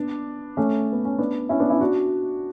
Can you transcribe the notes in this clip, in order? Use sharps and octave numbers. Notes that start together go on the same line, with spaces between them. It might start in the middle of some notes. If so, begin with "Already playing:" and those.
Already playing: B3 D4
A3 C#4
B3
C#4
B3 D4
C#4 E4
B3 D4
C#4 E4
D4 F#4